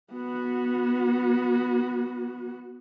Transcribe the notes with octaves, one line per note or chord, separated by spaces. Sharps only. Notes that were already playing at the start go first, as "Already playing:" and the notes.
B3 F#4